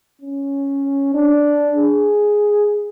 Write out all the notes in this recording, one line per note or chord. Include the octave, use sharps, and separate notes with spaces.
C#4
D4
G#4